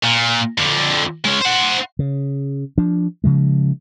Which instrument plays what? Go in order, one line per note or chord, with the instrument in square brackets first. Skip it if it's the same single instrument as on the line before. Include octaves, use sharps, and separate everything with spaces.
[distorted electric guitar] A#2
F2 D3
G#3 C#4
C5 F#5
[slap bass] C#3
F3 D4
C#3 F3 G#3